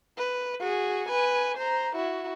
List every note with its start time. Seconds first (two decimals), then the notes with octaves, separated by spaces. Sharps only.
0.18 B4
0.60 F#4 G#4
1.09 B4 G#5
1.57 C5 A#5
1.96 E4 F#4